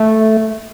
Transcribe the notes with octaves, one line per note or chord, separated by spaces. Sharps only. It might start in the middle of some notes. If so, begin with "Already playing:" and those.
Already playing: A3